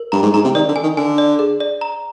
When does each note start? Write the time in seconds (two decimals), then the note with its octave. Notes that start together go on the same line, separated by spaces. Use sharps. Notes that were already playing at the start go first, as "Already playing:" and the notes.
Already playing: A#4
0.12 G2 A#5
0.23 G#2
0.34 G#2 A#5
0.44 C3
0.55 D#3 D5
0.69 D3
0.76 G#5
0.83 D#3
0.97 D3 G#5
1.18 D5
1.39 G#4
1.60 D5
1.81 A#5